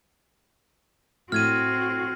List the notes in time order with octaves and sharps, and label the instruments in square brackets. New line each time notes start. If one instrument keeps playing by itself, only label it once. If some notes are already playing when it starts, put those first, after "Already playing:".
[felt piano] A2 [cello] C4 F#4 [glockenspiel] F6 G#6 D#7